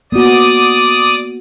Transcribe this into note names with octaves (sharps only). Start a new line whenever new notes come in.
A#3 B3 F#4 D5 D#6